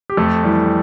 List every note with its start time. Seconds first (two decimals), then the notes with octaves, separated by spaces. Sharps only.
0.10 G4
0.17 F2 A3 A4
0.44 E3 G3